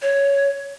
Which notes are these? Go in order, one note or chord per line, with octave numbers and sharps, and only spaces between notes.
C#5